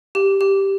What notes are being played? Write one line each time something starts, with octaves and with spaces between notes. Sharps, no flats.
G4
G4